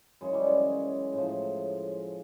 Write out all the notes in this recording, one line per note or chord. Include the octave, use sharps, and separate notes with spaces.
F#2 C#3 E3 G#3
G3
G#3
A2 F3